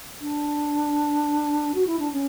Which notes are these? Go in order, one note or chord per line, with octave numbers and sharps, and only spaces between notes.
D4
F#4
E4
D4
C#4